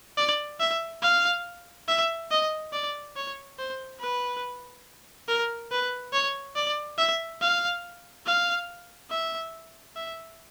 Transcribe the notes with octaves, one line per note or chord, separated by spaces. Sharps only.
D5
E5
F5
E5
D#5
D5
C#5
C5
B4
A#4
B4
C#5
D5
E5
F5
F5
E5
E5